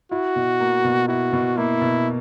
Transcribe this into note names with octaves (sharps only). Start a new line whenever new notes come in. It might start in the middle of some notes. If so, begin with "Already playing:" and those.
E4 F#4
B2
A#3
B2
E4 F#4
B2
A#3 E4
B2